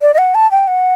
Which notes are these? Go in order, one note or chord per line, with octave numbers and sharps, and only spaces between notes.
D5
D#5
F#5
A5
G5
F#5